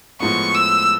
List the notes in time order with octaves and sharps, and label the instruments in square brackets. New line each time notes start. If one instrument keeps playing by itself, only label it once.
[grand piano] A2 F3 G#3 B3 [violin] C#6
[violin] E6